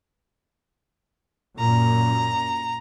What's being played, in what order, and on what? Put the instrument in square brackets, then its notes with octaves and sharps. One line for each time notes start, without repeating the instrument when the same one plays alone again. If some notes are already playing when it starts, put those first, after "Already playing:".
[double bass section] F#2 A#2 [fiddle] A#5